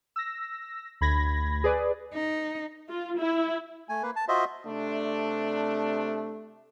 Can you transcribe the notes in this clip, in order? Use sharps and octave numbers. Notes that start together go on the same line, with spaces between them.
E6 A#6
D2 B5 G#6 A#6
G#4 B4 D5
D#4
F4
E4
A3 G#5
A#3 B4
A5
F4 F#4 C5 D#5 E5
C3 A3 D4